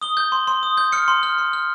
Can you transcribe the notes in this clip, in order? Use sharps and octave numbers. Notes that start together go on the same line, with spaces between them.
D#6 G7
G6
C6
C6
D#6
G6
F6 C#7
C6
F6
C6
F6